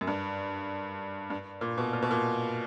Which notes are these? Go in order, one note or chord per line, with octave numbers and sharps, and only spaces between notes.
F#2
G2
G2
A#2
B2
A#2
B2
A#2